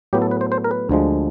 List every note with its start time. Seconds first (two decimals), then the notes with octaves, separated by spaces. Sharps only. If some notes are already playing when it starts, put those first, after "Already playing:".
0.13 A2 F#3 B3 G4
0.22 A4
0.31 B4
0.41 C5
0.52 C5
0.64 A#4
0.71 B4
0.89 D2 D3 F3 G#3